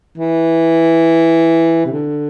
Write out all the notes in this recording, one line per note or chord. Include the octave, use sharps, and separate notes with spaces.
E3
C3
D3